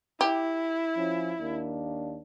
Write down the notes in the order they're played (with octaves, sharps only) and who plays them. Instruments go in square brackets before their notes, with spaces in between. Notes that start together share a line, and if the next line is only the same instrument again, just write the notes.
[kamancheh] E4 [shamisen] G4
[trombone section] F3 C#4
D#2 A#3 D4